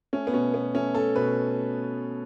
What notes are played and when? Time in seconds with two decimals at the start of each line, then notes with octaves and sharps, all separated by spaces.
0.13 A3 C#4
0.27 B3
0.33 B2 C#4
0.54 B2 B3
0.75 A3 C#4
0.95 A3 A4
1.16 B2 B4